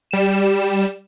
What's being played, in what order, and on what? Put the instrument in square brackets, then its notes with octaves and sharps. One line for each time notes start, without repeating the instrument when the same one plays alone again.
[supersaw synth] G3 E7